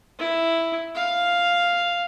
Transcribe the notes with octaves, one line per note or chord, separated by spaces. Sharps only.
E4
F5